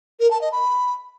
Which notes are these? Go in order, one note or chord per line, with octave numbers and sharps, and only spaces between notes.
A#4
A5
D#5
B5